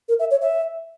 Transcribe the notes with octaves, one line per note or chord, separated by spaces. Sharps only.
A#4
E5
C#5
E5